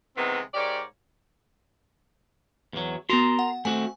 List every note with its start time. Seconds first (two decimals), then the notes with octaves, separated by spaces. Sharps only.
0.17 C3 D#3 E3 G#3 B3 C4
0.54 G#2 G4 A#4 C#5 D5
2.73 E2 F#3
3.09 B3 F#4 A#4 A#5 C6
3.39 F#5
3.65 A3 C4 F#4 G#5